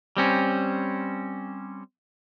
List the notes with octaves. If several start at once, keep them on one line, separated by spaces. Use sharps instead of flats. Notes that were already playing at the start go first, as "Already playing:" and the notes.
G3 C4 C#4